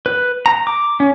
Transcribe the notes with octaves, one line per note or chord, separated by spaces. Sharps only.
B4
A#5
D6
C#4